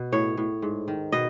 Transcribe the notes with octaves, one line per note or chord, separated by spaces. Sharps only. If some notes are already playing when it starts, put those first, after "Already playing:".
Already playing: B2
A2 C#5
A2
G#2
D#3
B2 D#5